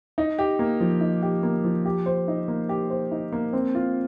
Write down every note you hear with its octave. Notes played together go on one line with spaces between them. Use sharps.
D#4
G4
A#3
F3
D#4
G4
A#3
F3
G4
C5
D#4
A#3
G4
C5
D#4
A#3
C4
F4